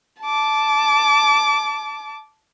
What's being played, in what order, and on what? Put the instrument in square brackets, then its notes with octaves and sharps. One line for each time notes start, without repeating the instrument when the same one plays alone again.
[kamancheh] A5 D6